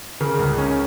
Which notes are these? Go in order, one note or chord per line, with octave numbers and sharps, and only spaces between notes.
C#3 A#4
C#2
C#4